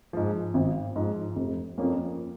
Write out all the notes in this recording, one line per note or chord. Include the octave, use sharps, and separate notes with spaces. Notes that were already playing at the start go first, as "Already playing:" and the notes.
G#2 F3
G#1
G#2 F3
F1
F2 F3 A#3 C#4